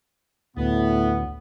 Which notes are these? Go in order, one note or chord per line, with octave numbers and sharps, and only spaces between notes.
D2 A2 B3